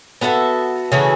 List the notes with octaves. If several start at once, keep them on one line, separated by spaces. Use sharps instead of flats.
B3 F#4 A4 E5
C#3 E3 A3 F#4